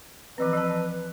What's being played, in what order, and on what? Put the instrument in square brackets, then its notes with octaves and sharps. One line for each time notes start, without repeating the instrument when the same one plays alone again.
[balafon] E3 F3 C4 [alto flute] B4
[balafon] F3 A5